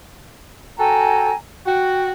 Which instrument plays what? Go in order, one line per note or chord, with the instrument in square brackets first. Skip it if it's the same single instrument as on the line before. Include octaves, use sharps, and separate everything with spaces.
[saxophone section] F#4 A4 [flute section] G5 G#5 A#5
[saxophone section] F#4 [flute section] G5